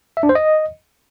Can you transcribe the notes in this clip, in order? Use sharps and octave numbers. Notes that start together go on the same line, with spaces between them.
E5
D4
C5
D#5